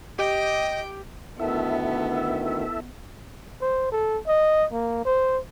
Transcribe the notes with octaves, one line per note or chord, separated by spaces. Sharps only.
G4 D#5 G5
D2 D#3 B3 E4 A4 E5
C5
A4
D#5
A#3
C5